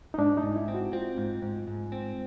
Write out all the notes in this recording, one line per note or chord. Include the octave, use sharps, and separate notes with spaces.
D#4
G#2 D4
D#4
G#2
E4
C4
F#4
C4 F4
G#2
G#2
G#2
C4